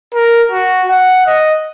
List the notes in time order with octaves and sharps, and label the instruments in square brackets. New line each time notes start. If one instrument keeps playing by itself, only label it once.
[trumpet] A#4
F#4
F#5
D#5